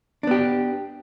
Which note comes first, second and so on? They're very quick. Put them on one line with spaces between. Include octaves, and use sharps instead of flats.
D4 B3 G4